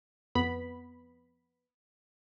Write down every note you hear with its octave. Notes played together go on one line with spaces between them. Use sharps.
F2 B3 B5